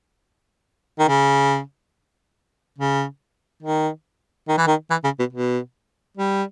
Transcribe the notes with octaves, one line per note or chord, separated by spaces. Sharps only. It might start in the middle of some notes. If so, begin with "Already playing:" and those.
D#3
C#3
C#3
D#3
D#3
E3
D#3
E3
C#3
B2
B2
G3